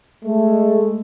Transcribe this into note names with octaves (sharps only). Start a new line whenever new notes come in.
G#3 A3